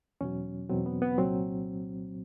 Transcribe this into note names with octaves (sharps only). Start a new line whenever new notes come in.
E2 B2 F#3 C#4
E2 B2 F#3 C4
B3
B3
C2 A#2 F#3 C4